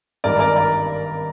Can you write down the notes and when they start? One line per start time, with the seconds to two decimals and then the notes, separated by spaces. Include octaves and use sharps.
0.24 G#1 G2 D#3 A#4 D5
0.39 A#4 D5
0.56 A#4 D5